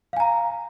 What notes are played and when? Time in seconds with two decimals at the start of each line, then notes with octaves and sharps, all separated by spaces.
0.13 F5
0.17 G#5
0.20 A#5